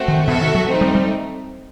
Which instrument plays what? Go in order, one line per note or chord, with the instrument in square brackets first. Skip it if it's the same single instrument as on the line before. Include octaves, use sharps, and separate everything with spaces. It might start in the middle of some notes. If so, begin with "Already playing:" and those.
Already playing: [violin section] A3 C4 F#4
[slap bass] D#3
[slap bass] B2 [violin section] F#4 A4 E5
[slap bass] D#3
F#3
[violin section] A3 C4 D#4
[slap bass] G3
G3